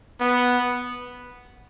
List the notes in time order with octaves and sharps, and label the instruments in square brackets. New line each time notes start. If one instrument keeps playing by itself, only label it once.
[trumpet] B3